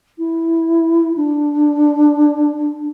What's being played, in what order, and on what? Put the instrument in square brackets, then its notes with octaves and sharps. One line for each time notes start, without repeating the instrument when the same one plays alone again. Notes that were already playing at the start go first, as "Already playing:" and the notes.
[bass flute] E4
D4